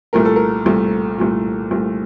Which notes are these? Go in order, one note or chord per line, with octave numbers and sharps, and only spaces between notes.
C2 A#2 A3 A#4
A4
A#4
C2 A#2 A3
C2 A#2 A3
C2 A#2 A3